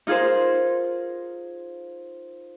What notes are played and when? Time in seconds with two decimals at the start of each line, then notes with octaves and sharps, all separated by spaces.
0.07 D#4 F4 G#4 A#4 C5